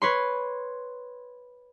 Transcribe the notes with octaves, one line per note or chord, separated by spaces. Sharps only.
B4 C#5 C6